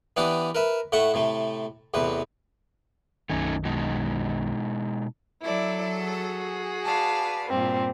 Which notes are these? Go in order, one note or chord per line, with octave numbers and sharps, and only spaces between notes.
E3 B3 D4 G4 B4 D6
A#4 B4 E5
A2 A3 E5 F#5 C#6
A2 C3 A3
A1 E2 C3 B4
B1 F#2 D#3 A3 C#4 D#4
B2 G#3 D#4
F#3 E4 A4 D5
F#4 G#4
B4 D5 F5 A5
G2 A#2 C4